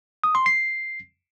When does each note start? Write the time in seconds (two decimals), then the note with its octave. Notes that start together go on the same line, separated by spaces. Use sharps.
0.24 D#6
0.35 C6
0.46 C7